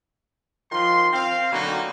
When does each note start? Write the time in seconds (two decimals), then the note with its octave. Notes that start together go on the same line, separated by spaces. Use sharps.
0.72 D#3 F3 F4 C6
1.13 C4 F5
1.52 B2 D3 F#3 A#3 D#4 F#4